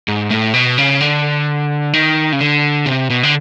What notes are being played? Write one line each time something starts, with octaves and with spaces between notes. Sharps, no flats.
G#2
A2
B2
C#3
D3
D#3
C#3
D3
C3
B2
D3